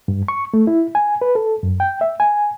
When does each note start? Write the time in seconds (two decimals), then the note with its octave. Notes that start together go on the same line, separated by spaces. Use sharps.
0.08 G2
0.28 C#6
0.54 A3
0.67 E4
0.95 G#5
1.21 B4
1.35 A4
1.63 F#2
1.80 G5
2.01 E5
2.20 G#5